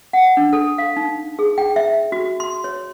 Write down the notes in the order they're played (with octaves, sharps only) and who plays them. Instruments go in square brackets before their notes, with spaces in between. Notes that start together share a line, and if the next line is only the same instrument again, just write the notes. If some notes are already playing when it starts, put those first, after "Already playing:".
[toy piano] F#5
D4
A4
F5
D#4
G#4
G5
E5
F#4
C6
C#5